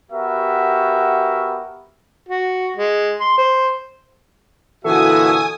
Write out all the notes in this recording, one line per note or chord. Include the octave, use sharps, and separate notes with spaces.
B3 F#4 G4 A#4 E5
F#4
G#3
C6
C5
A#2 D3 E3 F#4 A4 E5 G#5 D#6